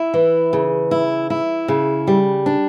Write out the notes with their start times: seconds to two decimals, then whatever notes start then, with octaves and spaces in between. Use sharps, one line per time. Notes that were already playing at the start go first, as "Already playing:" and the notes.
Already playing: E4
0.14 E3
0.53 C#3
0.91 E4
1.30 E4
1.68 C#3
2.07 G3
2.46 D4